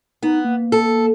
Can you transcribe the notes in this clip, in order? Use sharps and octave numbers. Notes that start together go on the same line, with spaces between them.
B3 D#4
A#3
A4